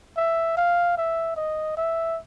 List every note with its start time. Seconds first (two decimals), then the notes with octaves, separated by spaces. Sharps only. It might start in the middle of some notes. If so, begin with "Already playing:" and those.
0.17 E5
0.57 F5
0.97 E5
1.37 D#5
1.77 E5